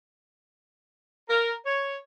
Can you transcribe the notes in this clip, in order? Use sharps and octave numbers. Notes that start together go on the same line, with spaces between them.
A#4
C#5